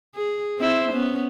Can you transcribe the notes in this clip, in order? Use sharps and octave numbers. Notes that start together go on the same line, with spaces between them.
G#4
C4 E4 C5
B3 C#4